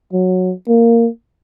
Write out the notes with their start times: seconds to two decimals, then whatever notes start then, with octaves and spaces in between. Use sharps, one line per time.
0.13 F#3
0.68 A#3